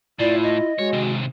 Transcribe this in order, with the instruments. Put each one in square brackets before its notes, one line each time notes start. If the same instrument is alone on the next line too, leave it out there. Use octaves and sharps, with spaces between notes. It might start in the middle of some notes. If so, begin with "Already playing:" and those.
[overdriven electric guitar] A2 [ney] E4 [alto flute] F4 [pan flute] D5
[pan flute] D#5
[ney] G#3 [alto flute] F#4 [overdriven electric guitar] C#5
[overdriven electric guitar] C3 D#3